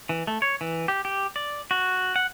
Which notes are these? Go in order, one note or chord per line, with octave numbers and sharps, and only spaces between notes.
E3
A3
C#5
E3
G4
G4
D5
F#4
F#5